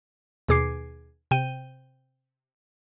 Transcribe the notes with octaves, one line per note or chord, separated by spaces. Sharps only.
D#2 B2 G#4 D6 C7
C3 G5 D#7